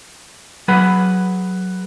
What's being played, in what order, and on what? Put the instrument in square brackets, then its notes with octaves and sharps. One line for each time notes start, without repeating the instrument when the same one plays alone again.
[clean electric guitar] F#3 G#4 B4 F#5 B5